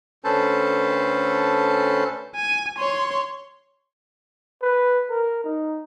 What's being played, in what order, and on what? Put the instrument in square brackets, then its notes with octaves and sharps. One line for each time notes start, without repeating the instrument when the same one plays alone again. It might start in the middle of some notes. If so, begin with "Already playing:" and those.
[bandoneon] D2 C#4 A4 B4 C5 A5
[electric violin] G#5
C#5 C6
[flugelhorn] B4
A#4
D#4